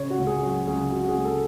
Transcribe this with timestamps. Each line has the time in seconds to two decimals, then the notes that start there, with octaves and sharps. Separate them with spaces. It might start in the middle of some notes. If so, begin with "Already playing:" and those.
Already playing: C#3 C#5
0.10 F#4
0.18 C#2
0.27 G#4
0.43 F#3 F#4
0.67 C#2 G#4
0.92 C#3 F#4
1.04 F#4
1.08 G#4
1.17 C#2
1.25 A4